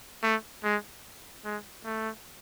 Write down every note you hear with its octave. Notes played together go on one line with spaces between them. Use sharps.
A3
G#3
G#3
A3